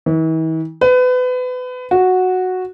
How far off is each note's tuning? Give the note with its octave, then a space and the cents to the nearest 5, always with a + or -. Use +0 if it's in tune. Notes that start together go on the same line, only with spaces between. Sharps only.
E3 -45
B4 +30
F#4 -5